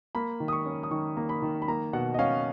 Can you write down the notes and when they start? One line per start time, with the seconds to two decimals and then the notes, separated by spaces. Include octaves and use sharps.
0.15 A#3 B5
0.40 D#3
0.48 D#6
0.53 C#6
0.66 C#4
0.83 D#6
0.91 D#3 C#6
1.17 A#3
1.29 B5
1.42 D#3
1.62 B5
1.68 A#3 A#5
1.93 B2 F#5
2.14 D#5
2.19 C#4 F5